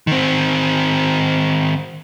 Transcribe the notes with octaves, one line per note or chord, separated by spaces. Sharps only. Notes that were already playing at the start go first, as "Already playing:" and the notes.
D#3 C4